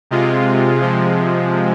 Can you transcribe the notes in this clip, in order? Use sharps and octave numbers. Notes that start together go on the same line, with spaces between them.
C3 G#3 F4
C3 F3 G#3